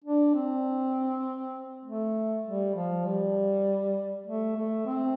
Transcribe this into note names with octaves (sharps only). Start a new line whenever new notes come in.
D4
C4
A3
G3
F3
G3
A3
A3
C4